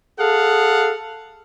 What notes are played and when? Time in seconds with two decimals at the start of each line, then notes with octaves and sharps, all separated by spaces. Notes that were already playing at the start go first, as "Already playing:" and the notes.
0.19 G#4 A4 F5 F#5